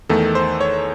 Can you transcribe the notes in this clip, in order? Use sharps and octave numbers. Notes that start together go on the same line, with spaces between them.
E2 D#3 A3 A4
C5
C#5